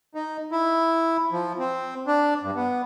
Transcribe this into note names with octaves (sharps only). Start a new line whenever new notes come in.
D#4
E4
F3
C4
D4
G2
B3